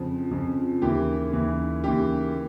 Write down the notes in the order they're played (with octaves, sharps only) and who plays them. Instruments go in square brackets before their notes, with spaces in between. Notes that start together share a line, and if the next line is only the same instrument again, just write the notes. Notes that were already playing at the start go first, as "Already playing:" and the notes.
Already playing: [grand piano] F2 C#3 F3
F2 C#3 F3
D#2 C#3 E3 G4
D#2 C#3 E3
D#2 C#3 E3 G4